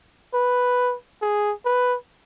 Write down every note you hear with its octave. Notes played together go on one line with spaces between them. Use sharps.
B4
G#4
B4